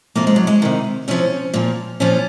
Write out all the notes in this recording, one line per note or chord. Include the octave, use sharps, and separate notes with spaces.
C3 F3 A#3
G#3
F#3
G#3
C3 D#3
C3 F3 C#4
A#2 F3
A#2 F3 C#4